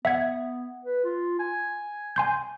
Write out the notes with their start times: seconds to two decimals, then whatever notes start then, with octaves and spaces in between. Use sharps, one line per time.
0.05 B3 E5 F#5 G#6
0.85 B4
1.04 F4
1.39 G#5
2.16 G#5 C6 G6